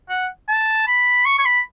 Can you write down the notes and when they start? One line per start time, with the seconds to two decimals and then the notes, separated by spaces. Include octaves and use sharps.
0.09 F#5
0.48 A5
0.88 B5
1.25 C#6
1.39 C#6
1.46 B5